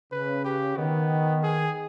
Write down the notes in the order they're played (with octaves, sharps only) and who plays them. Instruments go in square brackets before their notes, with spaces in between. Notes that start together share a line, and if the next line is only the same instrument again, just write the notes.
[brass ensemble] C#3 [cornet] B4
[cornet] G4
[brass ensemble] D#3 [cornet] B3
[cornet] G#4